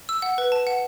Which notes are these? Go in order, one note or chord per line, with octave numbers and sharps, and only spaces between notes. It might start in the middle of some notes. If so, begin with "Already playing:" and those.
E6
F#5
B4
A5
F#5